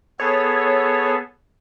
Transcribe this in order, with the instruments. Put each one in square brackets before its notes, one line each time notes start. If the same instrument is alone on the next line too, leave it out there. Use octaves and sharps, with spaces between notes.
[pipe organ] B3 G#4 A4 [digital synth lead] C#5